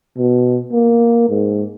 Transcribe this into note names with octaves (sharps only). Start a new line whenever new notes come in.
B2
A#3
G#2